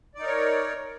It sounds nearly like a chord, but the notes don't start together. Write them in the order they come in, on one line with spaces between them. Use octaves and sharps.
D5 D#4 A#4 C#5